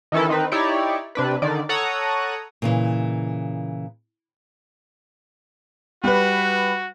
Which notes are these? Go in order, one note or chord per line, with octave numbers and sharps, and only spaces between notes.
D#3 E3 C#4 E4 A4
D#3 C4 D#4 B4
D#4 E4 G4 C#5 D5
C3 D4 B4
D3 D#3 D5
A4 C#5 F#5 A#5 D#6
A#2 C#3 E3
G3 F#4 B4